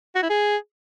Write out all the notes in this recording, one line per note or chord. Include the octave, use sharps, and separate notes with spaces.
F#4
E4
G#4